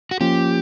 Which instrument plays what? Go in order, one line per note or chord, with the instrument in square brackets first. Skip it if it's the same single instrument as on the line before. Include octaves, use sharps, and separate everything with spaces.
[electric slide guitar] F#4
[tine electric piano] F3 A#3 C#4 F4 [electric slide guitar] G4